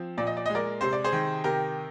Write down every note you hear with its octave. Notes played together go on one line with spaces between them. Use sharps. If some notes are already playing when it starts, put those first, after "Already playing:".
Already playing: F3 C4
A#2 D5
D#5
D5
G#3 D#5
A#4 D5
C3 C5
D5
G#4 C5
D#3
C3 G4 A#4